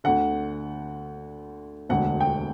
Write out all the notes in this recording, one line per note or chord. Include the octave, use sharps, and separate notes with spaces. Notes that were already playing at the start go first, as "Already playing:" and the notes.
D2 D3 F#5
E1 D2 D3 F#5
G5